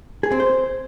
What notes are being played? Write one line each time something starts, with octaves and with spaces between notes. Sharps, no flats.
G#4
C4
C5